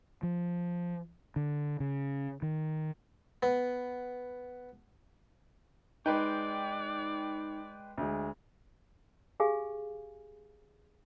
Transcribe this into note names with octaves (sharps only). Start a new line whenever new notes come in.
F3
D3
C#3
D#3
B3
G#3 D#4 B4 D5 G5
D2 G#3
G4 G#4 F5 G#5